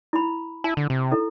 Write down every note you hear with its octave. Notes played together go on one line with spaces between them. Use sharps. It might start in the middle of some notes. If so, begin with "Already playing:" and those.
E4 B5
E4 A5
D3
C3
E4 A4